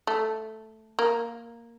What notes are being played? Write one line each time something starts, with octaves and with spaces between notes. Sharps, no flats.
A3
A#3